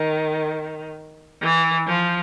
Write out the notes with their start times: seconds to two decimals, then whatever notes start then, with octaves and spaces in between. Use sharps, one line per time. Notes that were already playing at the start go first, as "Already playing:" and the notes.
Already playing: D#3
1.42 E3
1.87 F3